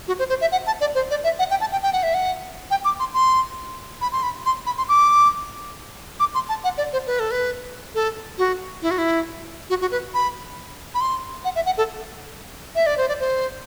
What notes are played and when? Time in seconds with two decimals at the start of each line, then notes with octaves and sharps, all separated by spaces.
0.08 F#4
0.19 C5
0.29 C5
0.41 E5
0.52 F#5
0.67 A5
0.81 D5
0.95 C5
1.10 D5
1.24 E5
1.39 F#5
1.50 G5
1.61 A5
1.72 G5
1.83 G5
1.93 F#5
2.03 E5
2.14 F#5
2.71 G5
2.85 D6
3.00 C6
3.14 C6
4.01 B5
4.12 C6
4.23 B5
4.46 C6
4.66 B5
4.78 C6
4.89 D6
6.20 D6
6.35 C6
6.49 A5
6.64 F#5
6.78 D5
6.93 C5
7.07 B4
7.20 A4
7.31 B4
7.95 A4
8.38 F#4
8.82 E4
8.91 F#4
8.98 E4
9.70 F#4
9.81 F#4
9.92 B4
10.14 B5
10.95 B5
11.01 C6
11.45 F#5
11.55 E5
11.66 F#5
11.78 A4
12.75 E5
12.86 D5
12.97 C5
13.08 D5
13.20 C5